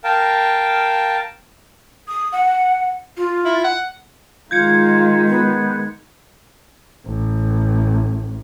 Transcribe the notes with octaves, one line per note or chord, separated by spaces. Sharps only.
A#4 F5 G5 A5
D#6
F#5
F4
E4
F#5
D#3 G#3 F4 F5 G6 G#6 C#7
B3
A1